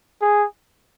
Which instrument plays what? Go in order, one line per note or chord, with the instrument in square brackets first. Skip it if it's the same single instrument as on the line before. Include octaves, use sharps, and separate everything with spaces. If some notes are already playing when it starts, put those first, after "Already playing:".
[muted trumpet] G#4